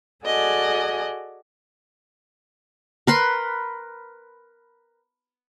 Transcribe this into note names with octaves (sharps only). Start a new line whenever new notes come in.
F#4 G#4 A4 D5 D#5 G#5
A#4 B4 C6